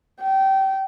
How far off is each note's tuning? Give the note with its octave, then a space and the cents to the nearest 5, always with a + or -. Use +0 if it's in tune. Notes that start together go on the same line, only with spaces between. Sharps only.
G5 -25